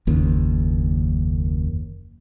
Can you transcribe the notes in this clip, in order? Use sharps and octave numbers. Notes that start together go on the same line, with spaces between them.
F#1 D#2